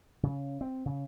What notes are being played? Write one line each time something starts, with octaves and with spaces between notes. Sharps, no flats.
C#3
C4
C#3